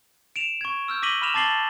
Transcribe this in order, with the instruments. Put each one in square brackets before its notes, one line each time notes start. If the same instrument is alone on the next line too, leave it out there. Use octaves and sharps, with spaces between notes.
[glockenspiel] D7 E7 F7
C#6 G#6
E6 F6 G6
D6 A#6 B6 D#7 F#7 G7
B5 D6 F6 E7 F7
A5 D6 A6 C7 F#7 G7